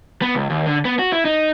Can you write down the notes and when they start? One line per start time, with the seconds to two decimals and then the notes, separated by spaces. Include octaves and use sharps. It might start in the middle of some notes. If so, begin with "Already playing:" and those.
0.22 B3
0.35 C#2
0.50 D#2
0.66 D3
0.85 B3
0.99 F#4
1.13 E4
1.25 D#4